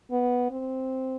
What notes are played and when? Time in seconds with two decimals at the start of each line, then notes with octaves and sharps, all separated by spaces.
0.11 B3
0.51 C4